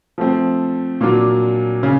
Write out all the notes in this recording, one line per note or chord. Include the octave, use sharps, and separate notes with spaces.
F3 A3 C4
A#2 F#3 A#3 D4 F4
C#3